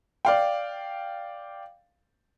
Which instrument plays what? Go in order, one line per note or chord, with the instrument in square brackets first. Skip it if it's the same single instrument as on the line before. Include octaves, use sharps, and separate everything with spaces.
[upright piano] D5 F5 G5